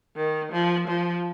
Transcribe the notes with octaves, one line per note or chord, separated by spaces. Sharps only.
D#3
F3
F3